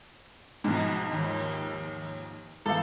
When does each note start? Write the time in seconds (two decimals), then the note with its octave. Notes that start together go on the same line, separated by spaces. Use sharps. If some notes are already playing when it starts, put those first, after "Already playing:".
0.64 G#2 B2 F3
1.12 D#2
2.66 G#1 E3 A4 F5